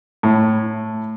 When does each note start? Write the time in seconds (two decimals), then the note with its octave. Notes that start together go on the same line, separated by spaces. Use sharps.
0.23 A2